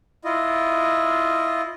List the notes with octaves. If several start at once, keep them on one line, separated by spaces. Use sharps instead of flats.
E4 F4 D#5